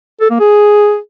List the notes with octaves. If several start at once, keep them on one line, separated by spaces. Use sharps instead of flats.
A4
A#3
G#4